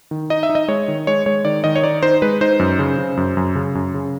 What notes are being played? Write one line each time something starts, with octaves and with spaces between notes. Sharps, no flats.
D#3
D#4 D#5
E5
D#4
D#5
G#3 C#5
D#3
G#3 C#5
G#3 C#5
D#3 D5
D#3 D#5
C#5
D#4 D5
D#4 C5
G#3 B4
D#4 C5
F#2
C#3
C#3
F#2
F#2
C#3
F#2
C#3